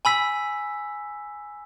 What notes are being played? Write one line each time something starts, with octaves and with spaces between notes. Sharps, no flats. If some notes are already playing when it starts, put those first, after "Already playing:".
G#5 B5 E6 B6